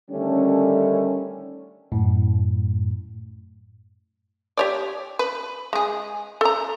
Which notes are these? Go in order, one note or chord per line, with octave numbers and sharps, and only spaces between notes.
D3 D#3 G3 A3 C#4
F#2 A2
G4 C#5 D5
B4
G#3 G#4
A4 A#5